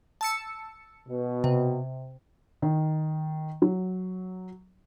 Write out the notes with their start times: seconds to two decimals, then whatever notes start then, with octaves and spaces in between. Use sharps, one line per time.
0.21 A5 E6 C#7
1.09 B2
1.44 C3
2.62 D#3
3.62 F#3